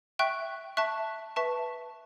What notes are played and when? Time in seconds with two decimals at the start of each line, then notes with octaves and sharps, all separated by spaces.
0.19 E5 G5 C#6 F#6
0.77 E5 A5 C#6 F#6
1.36 B4 E5 A5 C#6